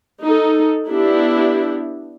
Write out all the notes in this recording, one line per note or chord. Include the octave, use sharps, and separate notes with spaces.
D#4 A4
B3 D4 E4 G4